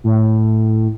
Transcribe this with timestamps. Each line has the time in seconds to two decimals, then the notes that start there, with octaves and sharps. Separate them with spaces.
0.04 A2